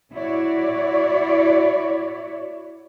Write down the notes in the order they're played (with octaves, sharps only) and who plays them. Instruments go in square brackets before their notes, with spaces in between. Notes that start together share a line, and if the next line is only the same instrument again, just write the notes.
[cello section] E4 F#4 C#5 D5